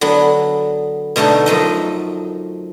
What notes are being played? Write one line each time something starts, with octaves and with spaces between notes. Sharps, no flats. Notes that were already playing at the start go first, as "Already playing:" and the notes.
D3 F#3 B3
B2 D3 A3 D4 D#4
F#2 F3 F#3 D#5